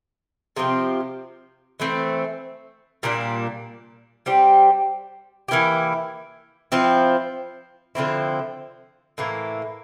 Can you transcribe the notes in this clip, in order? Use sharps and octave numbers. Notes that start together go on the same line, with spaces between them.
C3 F3 C4 G4
E3 A3 C4
A#2 G3 A#3 D4
G3 C4 G4
E3 A#3 E4 G4
F3 C4 E4
D3 F3 C4 E4
A2 E3 A#3